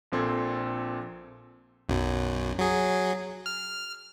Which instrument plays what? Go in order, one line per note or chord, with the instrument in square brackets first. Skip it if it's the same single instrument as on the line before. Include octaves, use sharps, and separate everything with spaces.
[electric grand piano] A#1 A#2 C4 A4 C6 G#6
[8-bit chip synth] B1 F#2
F#3 G#4
F6